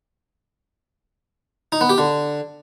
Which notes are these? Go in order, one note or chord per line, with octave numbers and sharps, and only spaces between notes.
D#4
B3
G4
D3